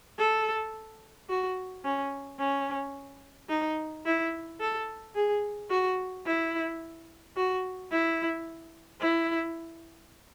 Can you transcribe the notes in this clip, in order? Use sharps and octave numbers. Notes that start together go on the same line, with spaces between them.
A4
F#4
C#4
C#4
D#4
E4
A4
G#4
F#4
E4
F#4
E4
E4